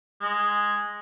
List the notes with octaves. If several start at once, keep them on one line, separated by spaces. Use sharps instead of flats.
G#3